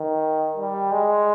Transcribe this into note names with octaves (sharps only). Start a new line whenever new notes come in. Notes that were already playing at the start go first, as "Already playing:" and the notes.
Already playing: D#3
G3
G#3